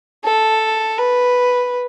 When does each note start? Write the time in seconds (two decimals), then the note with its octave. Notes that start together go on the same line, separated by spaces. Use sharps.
0.25 A4
0.98 B4